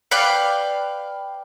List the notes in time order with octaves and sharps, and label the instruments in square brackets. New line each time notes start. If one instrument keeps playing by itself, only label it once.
[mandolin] B4 D5 F5 G5